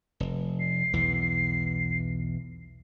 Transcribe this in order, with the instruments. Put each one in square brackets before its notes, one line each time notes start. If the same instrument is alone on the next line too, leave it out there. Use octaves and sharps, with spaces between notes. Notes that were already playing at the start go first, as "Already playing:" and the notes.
[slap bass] F1
[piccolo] C7
[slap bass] B1 E2 E3